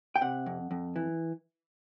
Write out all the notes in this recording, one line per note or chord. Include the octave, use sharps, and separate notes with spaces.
G5
C3 F#5
F2
F2
E3